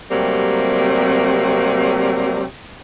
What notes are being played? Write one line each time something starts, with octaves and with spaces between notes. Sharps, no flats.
C3 F#3 G3 A3 A#3 C4